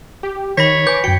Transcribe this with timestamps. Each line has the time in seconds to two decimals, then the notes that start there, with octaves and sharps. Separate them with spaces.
0.23 G4
0.58 D#3 C#5 B5 A#6 B6
0.87 B4 G#5 D6 G6
1.04 F#2 F#4 G5 C#7